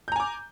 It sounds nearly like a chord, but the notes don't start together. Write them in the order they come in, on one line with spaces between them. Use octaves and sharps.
G6 A#5 G#5 D6